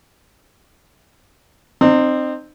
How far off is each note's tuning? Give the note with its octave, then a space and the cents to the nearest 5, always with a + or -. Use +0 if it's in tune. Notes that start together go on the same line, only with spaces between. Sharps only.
C4 +0 D#4 -35